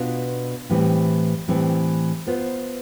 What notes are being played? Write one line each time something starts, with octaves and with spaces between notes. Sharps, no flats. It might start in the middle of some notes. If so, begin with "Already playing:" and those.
Already playing: B2 B3 D4 F4
A2 E3 G3 C4 E4
A2 E3 G3 C4 E4
B3 F4 C5